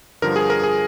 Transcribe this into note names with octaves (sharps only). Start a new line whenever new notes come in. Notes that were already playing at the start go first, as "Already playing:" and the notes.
G2 D3 F3 A#4
G#4
A#4
G#4